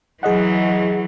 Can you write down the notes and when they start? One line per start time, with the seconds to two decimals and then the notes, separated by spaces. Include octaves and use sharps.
0.23 E3 F#3 G#4 D#5 F#5